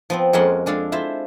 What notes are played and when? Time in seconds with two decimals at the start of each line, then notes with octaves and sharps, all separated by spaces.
0.10 F3 B3 C4
0.33 F2 G#3 A#3 C#4 F#5 C6
0.66 G#3 D4 A4 F5
0.92 E4 F4 C5 E5